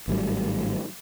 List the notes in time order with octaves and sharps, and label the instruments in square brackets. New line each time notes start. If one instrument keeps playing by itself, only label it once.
[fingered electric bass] G#1 A2 F#3 G3